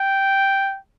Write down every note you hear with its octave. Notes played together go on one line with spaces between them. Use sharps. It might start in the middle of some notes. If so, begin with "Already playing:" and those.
Already playing: G5